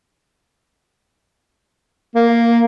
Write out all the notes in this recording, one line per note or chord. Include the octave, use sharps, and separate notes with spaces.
A#3